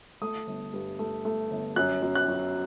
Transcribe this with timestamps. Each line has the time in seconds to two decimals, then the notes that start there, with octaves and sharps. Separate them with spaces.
0.22 A3 D#6
0.47 G1
0.74 G2
0.99 A3
1.25 A3
1.51 G1
1.76 F#2 F#6
2.02 F#2
2.15 F#6
2.28 F#3